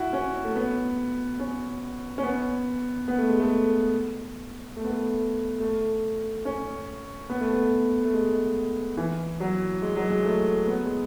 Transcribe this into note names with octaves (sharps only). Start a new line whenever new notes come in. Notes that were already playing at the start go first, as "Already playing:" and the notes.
Already playing: E4 F#4
C#4
A3
B3
C#4
C#4
B3
B3
A3
G#3
A3
A3
B3
A3
A3
C#4
B3
A3
B3
A3
G#3
E3
F#3
G#3
F#3
G#3
A3
B3
G#3